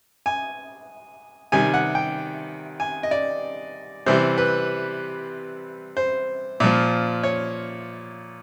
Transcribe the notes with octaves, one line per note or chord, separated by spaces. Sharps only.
G#5
C3 D#3 G3 G#5
F#5
G5
G#5
D#5
D5
C3 E3 G3 C5
B4
C5
A#2 F3
C#5